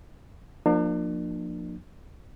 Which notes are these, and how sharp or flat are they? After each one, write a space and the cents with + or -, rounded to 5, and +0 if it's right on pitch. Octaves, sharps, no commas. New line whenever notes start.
F3 +15 A#3 +0 D4 +40